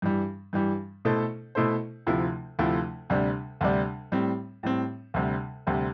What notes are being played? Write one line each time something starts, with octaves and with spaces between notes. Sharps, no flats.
G2 E3 G3
G2 E3 G3
B2 A3 E4 A4 C5
B2 A3 E4 A4 C5
D2 C3 F3 A3 E4
D2 C3 F3 A3 E4
D2 C3 G3 D4
D2 C3 G3 D4
A2 G3 C4
A2 G3 C4
D2 C3 G3
D2 C3 G3